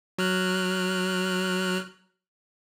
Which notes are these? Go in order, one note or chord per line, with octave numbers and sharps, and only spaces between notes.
F#3 F6 F#6